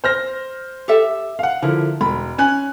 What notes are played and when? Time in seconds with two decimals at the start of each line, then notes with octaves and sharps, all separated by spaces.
0.04 C5 F6 A#6
0.88 G4 A4 E5
1.39 F5 F#5
1.62 D3 F3 E4 A#4
2.01 E1 B5
2.38 C#4 G#5 F#6